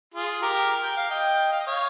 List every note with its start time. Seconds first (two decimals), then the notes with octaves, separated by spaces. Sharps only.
0.14 F4 G#4
0.42 G4 A#4
0.83 G5
0.97 F5
1.10 D#5 G5
1.52 F5
1.59 D#5
1.67 C#5 F5